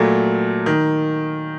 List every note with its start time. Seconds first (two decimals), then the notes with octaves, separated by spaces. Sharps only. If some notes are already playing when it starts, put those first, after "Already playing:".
Already playing: A#2 F#3 A3
0.66 D#3